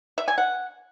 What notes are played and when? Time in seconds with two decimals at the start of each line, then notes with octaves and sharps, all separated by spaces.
0.18 E5
0.28 G#5
0.38 F#5